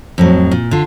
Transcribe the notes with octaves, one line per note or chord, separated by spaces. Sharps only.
F2 A2 F#3
A#2
D3 F4